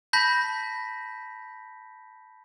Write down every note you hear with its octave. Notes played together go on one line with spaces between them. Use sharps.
A5 B5 G6 A#6 B6